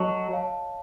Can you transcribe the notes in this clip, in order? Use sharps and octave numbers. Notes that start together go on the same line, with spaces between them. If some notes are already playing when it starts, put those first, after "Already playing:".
Already playing: F#3 A4 D#5 A5
C#5 F5 A5